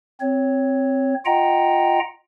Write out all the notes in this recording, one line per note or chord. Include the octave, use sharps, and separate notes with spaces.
C4 C#5
F4 D#5 F#5 G5 A#5